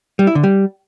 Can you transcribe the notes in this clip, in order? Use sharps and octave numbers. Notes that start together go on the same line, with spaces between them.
G3
E4
D3
G3